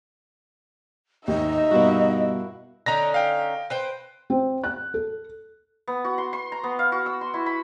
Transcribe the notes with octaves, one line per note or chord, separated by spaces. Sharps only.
D#2 G#2 D#4 D#5 E5
G2 B2 A#3 E4 F#4
D3 C#4 D#4 A#5 A#6
F5 G5
B4 C5 G5
C4
F#6
A4
B3
F#4
C6
C6
A#5
B3
F5
F#4
E6
C6
E4
B5